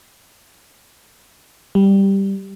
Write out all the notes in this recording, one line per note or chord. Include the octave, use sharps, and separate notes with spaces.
G3